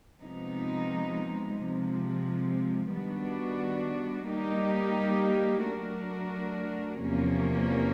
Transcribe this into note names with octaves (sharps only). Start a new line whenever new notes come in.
C3 F3 G#3 B3 D#4
C3 F3 G#3
D#3 G3 B3 D4 F#4
G3 A#3 D#4 G4
F#3 A3 D4 F#4 A#4
E2 C3 F3 A#3 C#4